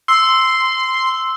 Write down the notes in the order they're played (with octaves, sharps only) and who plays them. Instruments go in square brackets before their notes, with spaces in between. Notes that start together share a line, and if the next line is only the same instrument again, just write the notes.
[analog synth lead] C6 [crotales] E6